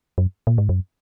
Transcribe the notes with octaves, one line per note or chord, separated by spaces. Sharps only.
F#2
A#2
G#2
F#2